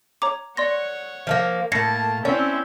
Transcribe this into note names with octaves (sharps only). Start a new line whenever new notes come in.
C#5 A#5 D6
C#5 D5 F#5 C6 A#6
F3 A3 A#3
A2 A#3 A5 A#6 C7 C#7
C4 C#4 E4 D5